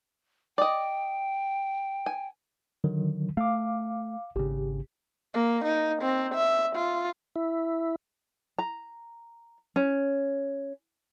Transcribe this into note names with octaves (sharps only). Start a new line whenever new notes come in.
D5 D#5 G5
G#5
D3 D#3 F#3
A3 F5 D6
G#1 C#3 G4
A#3
D#4
C4
E5
F4
E4
A#5
C#4